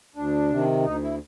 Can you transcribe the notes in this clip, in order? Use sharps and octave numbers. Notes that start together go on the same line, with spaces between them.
D2 D4
C3 D#3
D2 D#4
E4